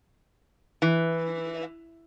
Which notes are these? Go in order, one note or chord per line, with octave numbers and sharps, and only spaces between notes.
E3